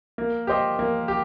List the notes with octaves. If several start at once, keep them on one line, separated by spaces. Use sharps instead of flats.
A#3
G4 C5 D#5
A#3
G4